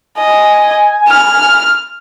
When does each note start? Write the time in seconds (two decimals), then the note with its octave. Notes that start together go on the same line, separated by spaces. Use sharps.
0.18 D#5 G#5
1.08 F6